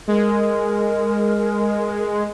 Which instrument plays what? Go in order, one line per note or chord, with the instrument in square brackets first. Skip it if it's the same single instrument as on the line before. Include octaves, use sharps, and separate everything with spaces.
[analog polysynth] G#3 [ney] A#4